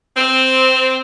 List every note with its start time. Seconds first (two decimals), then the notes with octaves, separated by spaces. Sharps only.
0.16 C4